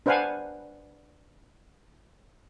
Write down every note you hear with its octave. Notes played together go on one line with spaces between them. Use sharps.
D4 B4 C5 F5 F#5 G#5